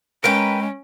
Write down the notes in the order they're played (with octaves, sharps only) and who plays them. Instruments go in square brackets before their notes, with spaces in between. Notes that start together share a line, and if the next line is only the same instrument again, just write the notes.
[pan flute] G#3 [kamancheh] C#4 [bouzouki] A#4 B4 G5 [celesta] D7